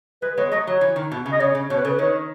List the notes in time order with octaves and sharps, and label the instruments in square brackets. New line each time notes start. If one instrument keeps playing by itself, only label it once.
[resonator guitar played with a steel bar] G#3 [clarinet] B4
[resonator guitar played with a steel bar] G#3 B3 [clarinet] C#5
[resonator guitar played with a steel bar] F#3 A3 [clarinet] D#5
[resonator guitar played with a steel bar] F#3 [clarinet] C#5
[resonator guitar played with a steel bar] E3
D#3
B2
C#3
[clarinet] D#5
[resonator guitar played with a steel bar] C#3 [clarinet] C#5
[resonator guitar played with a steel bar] C#3
[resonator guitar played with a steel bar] B2 [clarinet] C#5
[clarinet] B4
[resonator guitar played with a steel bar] C#3 [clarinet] A4
[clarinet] B4
[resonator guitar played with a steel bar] D#3 [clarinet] C#5